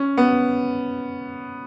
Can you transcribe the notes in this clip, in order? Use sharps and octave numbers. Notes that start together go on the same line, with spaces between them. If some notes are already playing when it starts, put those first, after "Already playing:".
Already playing: C#4
B3